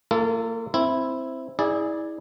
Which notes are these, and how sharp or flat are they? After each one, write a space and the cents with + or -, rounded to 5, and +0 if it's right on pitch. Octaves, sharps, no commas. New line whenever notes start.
A#3 -35 F4 -40 A4 +0
C4 +0 E4 +0
E4 -30 G#4 -5 D5 +10